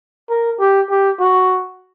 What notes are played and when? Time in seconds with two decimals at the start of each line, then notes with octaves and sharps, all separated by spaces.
0.30 A#4
0.60 G4
0.90 G4
1.20 F#4